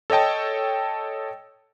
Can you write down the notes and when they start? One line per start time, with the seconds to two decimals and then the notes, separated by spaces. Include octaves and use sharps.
0.10 A4 C#5 D#5 G5 A5